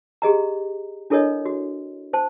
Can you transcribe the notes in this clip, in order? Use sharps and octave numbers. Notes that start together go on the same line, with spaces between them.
G4 G#4 D#5 A#5
D4 E4 A4 A#4 C#5 D#5
F#4
C5 A5